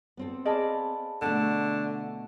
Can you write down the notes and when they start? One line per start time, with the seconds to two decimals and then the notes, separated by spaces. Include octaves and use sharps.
0.17 B3 C4 A4
0.45 G#4 D5 D#5 F5 A5 B5
1.22 B2 D3 A3 A5